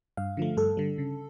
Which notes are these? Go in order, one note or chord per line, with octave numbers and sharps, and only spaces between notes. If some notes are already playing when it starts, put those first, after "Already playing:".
G2 F5
D3 F3 A3
G2 A4
D3 G3
C#3